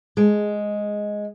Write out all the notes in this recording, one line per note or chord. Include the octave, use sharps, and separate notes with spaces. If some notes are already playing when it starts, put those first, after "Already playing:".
G#3